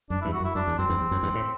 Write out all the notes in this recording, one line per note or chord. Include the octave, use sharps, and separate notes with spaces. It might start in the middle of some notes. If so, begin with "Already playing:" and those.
F#2 D4
E2 G2 E4
F#4
F#2
E4
F#2 D4
E2
F#2 C4
E2 G2
E2
F#2
E2 G2
A2